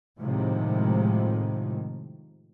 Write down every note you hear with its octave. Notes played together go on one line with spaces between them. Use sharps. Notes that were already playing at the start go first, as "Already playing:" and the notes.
A2 C3 D#3 F3 G#3